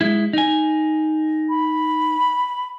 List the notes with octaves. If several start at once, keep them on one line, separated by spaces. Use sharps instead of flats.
G#3 E4
D#4 G#5
B5